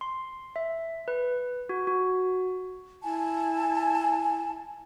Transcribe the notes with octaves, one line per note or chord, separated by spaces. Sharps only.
C6
E5
B4
F#4
F#4
E4 G#5 A5